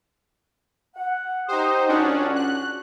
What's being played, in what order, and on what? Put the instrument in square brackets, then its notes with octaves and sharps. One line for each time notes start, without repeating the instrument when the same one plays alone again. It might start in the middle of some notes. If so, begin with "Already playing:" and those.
[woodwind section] F#5
[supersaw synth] D#4 C5 [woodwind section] G4 D#6
[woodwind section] C#2 F#4 [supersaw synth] C#4 D4
[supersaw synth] F#6